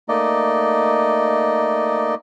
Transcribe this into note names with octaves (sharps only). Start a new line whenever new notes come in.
A3 A#3 D#4 D5 D#5